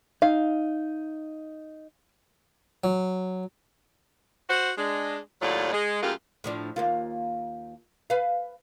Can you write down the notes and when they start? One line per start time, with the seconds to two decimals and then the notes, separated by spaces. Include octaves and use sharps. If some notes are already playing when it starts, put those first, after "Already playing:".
0.22 D#4 F5
2.84 F#3
4.49 F#4 C5
4.77 G#3 D4
5.42 D#2 A2 F#3 F4 D5
5.72 G#3
6.03 F#2 A3 A#3 F4 G4 G#4
6.44 A2 F3 D4
6.76 D#2 A#3 F4
8.10 B4 F5